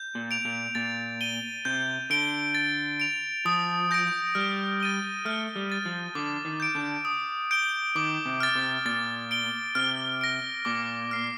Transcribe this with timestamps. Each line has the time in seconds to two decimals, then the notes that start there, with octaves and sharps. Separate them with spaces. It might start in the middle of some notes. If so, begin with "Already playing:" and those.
Already playing: G6
0.15 A#2
0.31 D7 F7
0.45 A#2
0.75 A#2 A6
1.21 D#7 G7
1.65 C3 G6
2.10 D3 D7 G7
2.55 A6
3.00 D7 F7
3.45 F3 D#6
3.91 G6 A#6 D7
4.35 G3 F6
4.80 A6 D#7 G7
5.25 A3 F6
5.56 G3
5.70 A6 D#7
5.85 F3
6.15 D3 D6
6.45 D#3
6.60 G6 D7
6.75 D3
7.05 D#6
7.51 G6 D7 G7
7.95 D#3 D6
8.26 C3
8.40 F6 A6
8.55 C3
8.86 A#2 A6
9.31 D7 G7
9.75 C3 F6
10.21 A#6 D7
10.65 A#2 D6
11.11 F6 C7